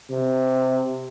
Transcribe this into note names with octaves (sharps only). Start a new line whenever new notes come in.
C3